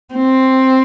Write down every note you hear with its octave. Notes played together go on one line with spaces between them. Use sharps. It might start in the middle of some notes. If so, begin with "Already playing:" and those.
C4